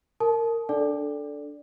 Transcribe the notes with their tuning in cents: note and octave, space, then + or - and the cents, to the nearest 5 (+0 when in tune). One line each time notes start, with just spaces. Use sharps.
A#4 -20 A5 -30
D4 -5 A4 +0 D5 -10